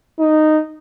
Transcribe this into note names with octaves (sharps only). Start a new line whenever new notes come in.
D#4